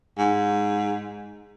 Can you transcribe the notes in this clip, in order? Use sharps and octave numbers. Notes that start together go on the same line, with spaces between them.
G#2